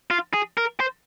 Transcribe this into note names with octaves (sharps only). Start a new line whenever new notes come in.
F4
G#4
A#4
C5